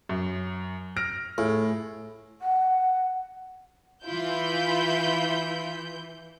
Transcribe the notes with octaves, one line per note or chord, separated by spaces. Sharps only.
F#2
F6 A#6 D7
A2 G#4
F#5
E3 E4 F4 B5 G6